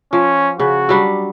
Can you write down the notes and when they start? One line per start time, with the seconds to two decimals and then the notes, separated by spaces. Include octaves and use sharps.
0.13 F3 C#4
0.60 C#3 F#4
0.89 F#3 G3 D4